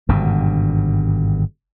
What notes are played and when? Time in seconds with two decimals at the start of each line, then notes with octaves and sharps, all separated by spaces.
0.09 G#1 G2 B2 D3